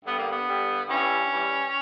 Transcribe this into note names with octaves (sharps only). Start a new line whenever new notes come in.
G2 D3 G3 B3
A#3
B3
G2 D3 G3
G2 E3 G3 C#4
E3 G3